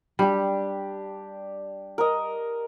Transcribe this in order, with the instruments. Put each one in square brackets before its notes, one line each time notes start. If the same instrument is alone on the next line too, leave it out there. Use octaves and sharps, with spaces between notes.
[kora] G3 [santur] D4 G4
[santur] A#4 D#5